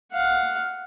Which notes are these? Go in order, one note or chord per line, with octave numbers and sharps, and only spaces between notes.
F5 F#5